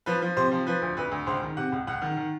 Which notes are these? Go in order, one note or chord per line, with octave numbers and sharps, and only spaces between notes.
F3 B4
F3
C3 C5
F3
F3 B4
D2
D2 B4
D2
C#2 C5
D#3
C3 F#5
C#2
C#2 F#5
D#3
D#3